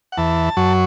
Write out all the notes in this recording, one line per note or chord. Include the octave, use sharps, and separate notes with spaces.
F#5
E2 E3 A5
F#2 F#3